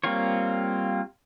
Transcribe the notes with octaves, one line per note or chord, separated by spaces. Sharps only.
G3 A#3 C4 F4 C#5